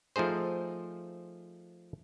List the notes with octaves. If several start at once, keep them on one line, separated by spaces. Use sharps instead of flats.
F3 A3 D#4 G#4 C5